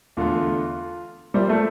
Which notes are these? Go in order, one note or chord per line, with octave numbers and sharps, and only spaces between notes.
E2 D3 A3 F4
F3 G3 A#3 F4 C5 E5
A3